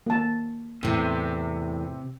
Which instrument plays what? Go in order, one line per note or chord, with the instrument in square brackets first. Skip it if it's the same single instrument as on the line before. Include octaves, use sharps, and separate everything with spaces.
[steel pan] A#3 A5
[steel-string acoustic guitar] E2 A2 [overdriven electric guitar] C3